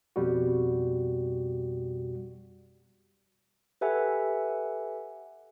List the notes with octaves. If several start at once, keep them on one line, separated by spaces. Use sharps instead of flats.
F2 B2 G3 F#4
G4 A4 B4 E5 F#5 G#5